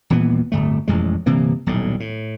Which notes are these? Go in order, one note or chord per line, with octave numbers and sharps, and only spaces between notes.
D#1 A#2 E3 B3
D1 G1 A3
E1 A1 F2 G#3
G1 C3 E3 A#3
D#1 B1 A2
A2